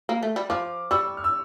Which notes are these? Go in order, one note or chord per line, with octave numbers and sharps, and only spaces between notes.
A#3
A3
G3
F3 D6 F6
G3 C#6 E6
F6
E6